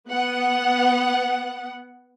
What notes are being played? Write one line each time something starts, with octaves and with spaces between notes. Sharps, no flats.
B3 F#5